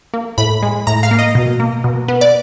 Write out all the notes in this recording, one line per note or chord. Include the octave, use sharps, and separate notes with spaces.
A#3
A2 B5
G#3
A2 A#5
F5
A#3
D#5
B2
A#3
B2
B3
D5